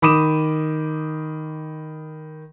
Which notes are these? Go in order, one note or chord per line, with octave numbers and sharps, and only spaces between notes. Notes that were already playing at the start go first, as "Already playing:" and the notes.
D#3 B5 D6 D#6 D#7 E7